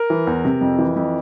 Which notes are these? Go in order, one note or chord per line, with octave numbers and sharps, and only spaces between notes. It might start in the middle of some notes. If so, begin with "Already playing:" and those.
Already playing: A#4
E3
E2
C3
F2
E3
F2